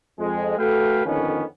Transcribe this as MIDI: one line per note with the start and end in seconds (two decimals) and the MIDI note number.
0.19 0.55 41
0.19 0.55 56
0.58 1.03 57
0.58 1.03 66
0.58 1.03 69
0.58 1.03 71
0.58 1.03 77
0.58 1.03 79
1.05 1.43 41
1.05 1.43 50
1.05 1.43 51
1.05 1.43 59
1.05 1.43 61